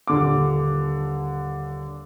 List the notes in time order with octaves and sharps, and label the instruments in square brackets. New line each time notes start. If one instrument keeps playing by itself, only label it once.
[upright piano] D#1 D3 D6